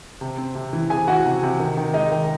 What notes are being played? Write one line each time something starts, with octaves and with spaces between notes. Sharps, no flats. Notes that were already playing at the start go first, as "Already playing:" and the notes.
C3
C4
C3
E3
C3 G#4 G#5
E3 F#4 F#5
C3
C3
D#3
D#3
G#3 D#4 D#5
D#3